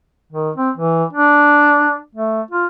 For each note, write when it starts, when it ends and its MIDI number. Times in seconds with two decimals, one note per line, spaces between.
0.33 0.50 51
0.56 0.70 60
0.77 1.04 52
1.13 1.98 62
2.15 2.41 57
2.51 2.66 65